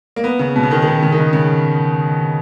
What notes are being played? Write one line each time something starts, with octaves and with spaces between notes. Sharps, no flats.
A#3
B3
C#3
B2
C#3
D#3
D#3
C#3
C#3
D#3
C#3
C#3